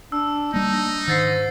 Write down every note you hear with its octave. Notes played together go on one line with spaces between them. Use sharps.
D4 E6
G3 A#3 D4 D#4
G#2 D#3 E6 A6 C7